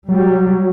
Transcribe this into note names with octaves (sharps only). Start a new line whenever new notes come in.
F#3 G3